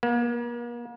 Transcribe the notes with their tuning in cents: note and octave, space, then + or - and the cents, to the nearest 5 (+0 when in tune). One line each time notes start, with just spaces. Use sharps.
A#3 +40